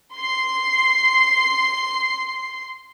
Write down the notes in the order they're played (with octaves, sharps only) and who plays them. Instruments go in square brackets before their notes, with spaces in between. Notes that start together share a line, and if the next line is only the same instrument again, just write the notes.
[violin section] C6 C7